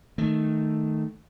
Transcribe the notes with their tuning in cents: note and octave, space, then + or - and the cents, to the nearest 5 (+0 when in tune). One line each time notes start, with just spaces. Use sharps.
D#3 +0 A3 +0